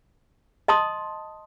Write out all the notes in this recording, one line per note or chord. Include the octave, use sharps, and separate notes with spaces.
D#5 A5 C6 D#6